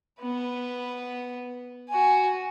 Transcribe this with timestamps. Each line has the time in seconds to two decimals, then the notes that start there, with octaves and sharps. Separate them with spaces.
0.20 B3 B4
1.89 F#4 G#5